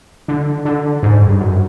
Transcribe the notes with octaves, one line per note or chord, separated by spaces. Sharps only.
D3
D3
G#2
G2
F#2